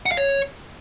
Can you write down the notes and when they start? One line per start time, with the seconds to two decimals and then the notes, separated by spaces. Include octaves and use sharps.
0.06 F#5
0.12 F5
0.17 C#5